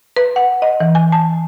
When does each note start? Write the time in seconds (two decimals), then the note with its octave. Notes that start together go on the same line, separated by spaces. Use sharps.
0.16 B4
0.36 F#5
0.62 D#5
0.80 E3
0.95 G#5
1.12 A5